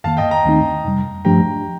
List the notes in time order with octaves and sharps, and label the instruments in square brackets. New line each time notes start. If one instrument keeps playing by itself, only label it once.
[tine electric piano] F2 D#3 A#3 [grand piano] F5 A5
[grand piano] D#5 G5
G5 A#5
[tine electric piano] D#2 D#3 A3 C4 D#4
F2 C3 G3
[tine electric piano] G2 F3 A3 D4 G4 [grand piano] G5 A#5